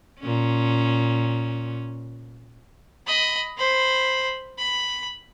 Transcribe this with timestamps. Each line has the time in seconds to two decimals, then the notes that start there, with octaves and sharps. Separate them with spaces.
0.20 A#2 C#4
3.07 D#5 B5
3.58 C5 B5
4.59 B5